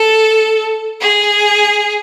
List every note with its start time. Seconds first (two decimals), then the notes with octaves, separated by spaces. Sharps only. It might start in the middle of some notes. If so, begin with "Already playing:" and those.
Already playing: A4
1.01 G#4